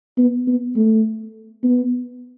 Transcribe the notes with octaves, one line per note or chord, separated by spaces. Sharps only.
B3
B3
A3
B3